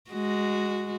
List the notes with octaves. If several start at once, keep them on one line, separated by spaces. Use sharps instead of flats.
G#3 F#4